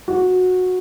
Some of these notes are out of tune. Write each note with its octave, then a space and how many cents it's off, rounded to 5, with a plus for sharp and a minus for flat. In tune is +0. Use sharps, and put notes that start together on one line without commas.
F#4 -15